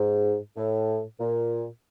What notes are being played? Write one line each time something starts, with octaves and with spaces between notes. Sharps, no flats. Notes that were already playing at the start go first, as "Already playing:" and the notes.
Already playing: G#2
A2
A#2